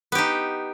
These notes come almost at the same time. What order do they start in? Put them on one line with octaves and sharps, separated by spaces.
B3 G4 D#4